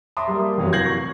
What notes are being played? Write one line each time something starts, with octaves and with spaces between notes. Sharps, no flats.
E5 A5 A#5 C6 D6 D#6
G3 A#3
F1 E3 F#3 F5
G6 G#6 A#6 C7 F#7
C#6